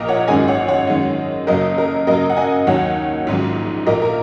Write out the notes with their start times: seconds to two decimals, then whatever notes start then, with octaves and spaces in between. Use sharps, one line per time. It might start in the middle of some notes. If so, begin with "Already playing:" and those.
Already playing: A#1 A#2 A#3 A#4 D#5
0.08 C#5 F#5
0.28 G#1 F#2 D#3 G#3 C#4 D#5 G#5
0.48 C#5 F#5
0.68 C#5 F#5
0.87 F#2 D#3 G#3 D#4
1.47 F#1 F#2 C#3 F#3 A#4 D#5
1.78 A#4
2.07 F#2 C#3 F#3 A#3 A#4 D#5
2.30 F#5
2.37 D#5 G#5
2.67 D#2 D#3 F#3 D#4 C#5 F#5
3.27 A#1 G#2 D#3 F#3 C#4
3.87 A#1 A#2 A#3 A#4 D#5
4.02 A#4